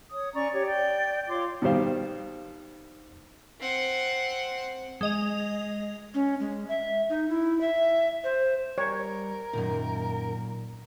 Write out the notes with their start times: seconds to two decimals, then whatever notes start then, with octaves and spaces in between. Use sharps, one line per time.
0.11 C#5 D#6
0.34 C#4 D5 A#5 C#6
0.53 G4 C#5
0.66 D5 G5
1.29 F4 C#5 C6 D6
1.62 B2 D#3 G3 C5 F5
3.60 C4 F#5
5.01 G#3 D#5 F7
6.14 C#4
6.40 G#3
6.68 E5
7.09 D#4
7.29 E4
7.61 E5
8.24 C5
8.78 G3 A#4 C#5
9.53 F#2 A#2 D#3